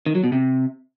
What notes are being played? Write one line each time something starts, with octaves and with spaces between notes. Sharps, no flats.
D#3
F#3
B2
C3